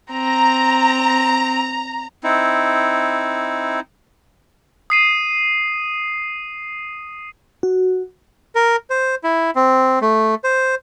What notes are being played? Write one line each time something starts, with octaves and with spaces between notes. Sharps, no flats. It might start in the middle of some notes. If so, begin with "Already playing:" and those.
C4 A#5
C4 D#4 E4
D#6 C7 D#7
F#4
A#4
C5
E4
C4
A3
C5